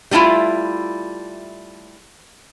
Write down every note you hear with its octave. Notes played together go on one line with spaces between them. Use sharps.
G3 A3 C#4 E4 F4